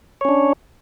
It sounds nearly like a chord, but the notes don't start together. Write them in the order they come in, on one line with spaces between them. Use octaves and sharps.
C#5 C#4 D4